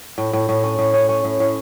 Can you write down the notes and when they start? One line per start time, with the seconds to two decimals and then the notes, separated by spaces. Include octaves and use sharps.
0.18 A2
0.33 A2
0.49 A2
0.64 C#4
0.79 A2
0.93 C#4
1.09 C#4
1.24 A2
1.40 A2